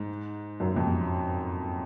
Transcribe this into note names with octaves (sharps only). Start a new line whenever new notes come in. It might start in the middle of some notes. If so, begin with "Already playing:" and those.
Already playing: G#2
F#2
F2